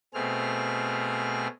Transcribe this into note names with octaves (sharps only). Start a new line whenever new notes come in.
B2 A3 C4 G#4 F6